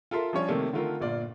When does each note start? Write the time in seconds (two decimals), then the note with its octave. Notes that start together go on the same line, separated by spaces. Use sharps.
0.11 F4 A4 A#4 E5 C6
0.33 F3 G3 C#4 D4 C#5
0.48 C3 D#3 A3 A#3
0.73 D3 D#3 A3 F4 A#4
1.01 G1 A#2 F4 D5